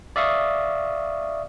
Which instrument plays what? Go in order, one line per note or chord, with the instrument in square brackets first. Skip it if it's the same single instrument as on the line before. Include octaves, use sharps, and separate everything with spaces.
[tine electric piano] D5 E5 F5 C#6 D#6